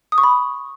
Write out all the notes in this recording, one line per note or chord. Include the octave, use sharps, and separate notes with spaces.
D#6
C#6
B5